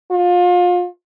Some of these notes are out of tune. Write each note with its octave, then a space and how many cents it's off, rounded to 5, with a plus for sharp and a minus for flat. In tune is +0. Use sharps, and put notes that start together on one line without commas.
F4 +30